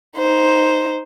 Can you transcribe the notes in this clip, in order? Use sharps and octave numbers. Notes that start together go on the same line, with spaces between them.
D#4 C5